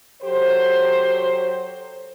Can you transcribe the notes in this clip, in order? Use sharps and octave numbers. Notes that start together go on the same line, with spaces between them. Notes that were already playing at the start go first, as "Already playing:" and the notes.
F#3 G4 A4 C5